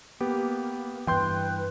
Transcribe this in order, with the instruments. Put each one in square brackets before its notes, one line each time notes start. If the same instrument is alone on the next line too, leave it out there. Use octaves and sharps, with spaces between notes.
[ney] A#3 [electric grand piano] B3 G4
[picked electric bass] G2 E3 [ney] B4 [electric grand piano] G5 C6 G6